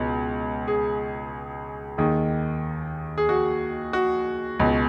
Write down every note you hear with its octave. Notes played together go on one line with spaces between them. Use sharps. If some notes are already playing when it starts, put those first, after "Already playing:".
Already playing: C#2 B2
G#4
D#2 D#3 G#4
G#4
F#4
F#4
C#2 B2